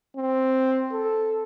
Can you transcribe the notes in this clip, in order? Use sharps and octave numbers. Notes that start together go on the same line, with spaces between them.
C4
A4